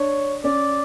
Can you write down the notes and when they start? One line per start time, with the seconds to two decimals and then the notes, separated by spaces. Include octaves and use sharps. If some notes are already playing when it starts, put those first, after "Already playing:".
Already playing: D4 C#5
0.44 C#4 D5